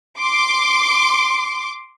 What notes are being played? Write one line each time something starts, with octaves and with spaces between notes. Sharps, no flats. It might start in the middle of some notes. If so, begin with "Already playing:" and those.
C6 D6